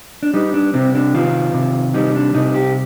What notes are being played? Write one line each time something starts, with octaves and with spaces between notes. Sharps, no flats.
D4
G3 D#4
D4
C3 C4
D4
D#3 F4
C3
G3 D#4
D4
C3 D#4
G4